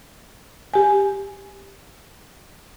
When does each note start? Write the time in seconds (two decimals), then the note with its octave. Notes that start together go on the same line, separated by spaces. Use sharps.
0.74 G4 G#5